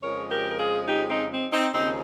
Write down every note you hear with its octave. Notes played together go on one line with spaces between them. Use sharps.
F2 C#3 F3 G#3 A#4 C#5
G4 A#4
A#4
F4 G#4
D#4 G4
C4 D#4
C4
C4 D#4
D#2 C#3 F3 C4 D#4